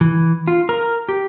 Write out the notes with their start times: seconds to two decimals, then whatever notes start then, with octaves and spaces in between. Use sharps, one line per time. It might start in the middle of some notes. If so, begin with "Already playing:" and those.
0.01 E3
0.47 F4
0.69 A#4
1.09 G4